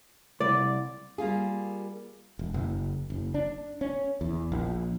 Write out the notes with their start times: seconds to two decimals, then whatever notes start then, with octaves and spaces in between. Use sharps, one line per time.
0.40 C2 D5
1.18 G3 A#3 F4 G#4
2.39 E1
2.54 F#1
3.10 F#1
3.34 D4
3.81 C#4
4.21 E2
4.52 A#1